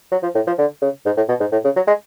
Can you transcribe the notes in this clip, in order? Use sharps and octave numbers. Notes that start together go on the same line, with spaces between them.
F#3
F3
A2
F3
D3
C#3
G#2
A2
B2
G#2
A2
C#3
F#3
G#3